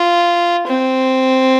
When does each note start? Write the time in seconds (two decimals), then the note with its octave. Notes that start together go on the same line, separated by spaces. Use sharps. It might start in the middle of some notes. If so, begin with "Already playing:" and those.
Already playing: F4
0.67 C4